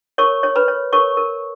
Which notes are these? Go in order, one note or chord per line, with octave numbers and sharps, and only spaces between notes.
A#4 C#5 C#6
C#5
B4 B5
C#5
A#4 C#5 C#6
A#4